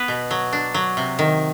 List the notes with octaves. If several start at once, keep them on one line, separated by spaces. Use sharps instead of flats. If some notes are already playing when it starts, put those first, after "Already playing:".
Already playing: B3 B4
B2
F#3
D4
F#3
C3
D#3